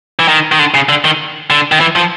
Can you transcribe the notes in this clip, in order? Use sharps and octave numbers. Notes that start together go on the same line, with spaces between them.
E3
D#3
D#3
D3
C#3
D3
D#3
D3
D#3
E3
F3